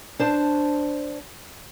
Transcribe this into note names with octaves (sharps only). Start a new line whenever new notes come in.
D4 C5 A5